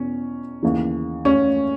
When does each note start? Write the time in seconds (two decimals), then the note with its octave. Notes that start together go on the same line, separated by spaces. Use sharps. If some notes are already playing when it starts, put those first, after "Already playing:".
Already playing: E2 B2 C#4
0.63 D#2 C#3 E3
1.25 C#4